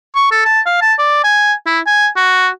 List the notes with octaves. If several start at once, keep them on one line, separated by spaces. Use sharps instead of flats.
C#6
A4
A5
F5
A5
D5
G#5
E4
G#5
F#4